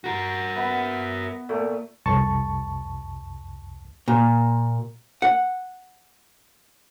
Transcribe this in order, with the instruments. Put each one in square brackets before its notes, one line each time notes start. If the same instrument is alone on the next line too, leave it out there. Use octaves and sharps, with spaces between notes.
[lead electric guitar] F#4 A#4
[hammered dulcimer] B3 [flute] E5
[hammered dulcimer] A#2 A3
[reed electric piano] C2 F2 A5 C#6
[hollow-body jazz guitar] A#2
F#5